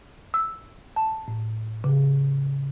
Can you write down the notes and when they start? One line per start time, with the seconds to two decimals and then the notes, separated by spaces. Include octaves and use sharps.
0.34 E6
0.96 A5
1.28 A2
1.84 C#3